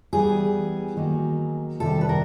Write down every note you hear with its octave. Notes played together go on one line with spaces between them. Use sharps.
E3 G3 B3 G#4
D#3 F#3 A#3
C3 D#3 G3 A4
B4
A#4